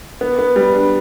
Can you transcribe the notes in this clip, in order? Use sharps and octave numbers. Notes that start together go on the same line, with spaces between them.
B3
B3
G3
D4